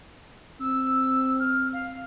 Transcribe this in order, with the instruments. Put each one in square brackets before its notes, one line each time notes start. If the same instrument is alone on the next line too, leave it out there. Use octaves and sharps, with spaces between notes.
[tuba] C4 [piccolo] E6
[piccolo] F6
F5